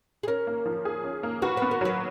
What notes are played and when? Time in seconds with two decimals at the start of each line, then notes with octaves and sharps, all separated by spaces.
0.23 G#4
0.27 C#4 A#4
0.47 A#3
0.66 F3
0.85 G#4
1.04 C#4
1.23 A#3
1.42 F#4 B4
1.57 B3 B4
1.71 A#4
1.81 F#3 B4